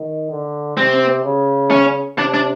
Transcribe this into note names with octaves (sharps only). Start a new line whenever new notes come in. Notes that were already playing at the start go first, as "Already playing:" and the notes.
Already playing: D#3
D3
C3 C4
C#3
C#4
C3 D4
D4